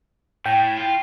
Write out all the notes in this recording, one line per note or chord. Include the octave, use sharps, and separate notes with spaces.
A2 G5
F4